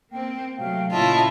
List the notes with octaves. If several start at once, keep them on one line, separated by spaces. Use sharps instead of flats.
A#3 C4 G5
C3 F#3 A3 F5 G5
A#2 C#3 A#3 C#4 E4 F4 D#5 A5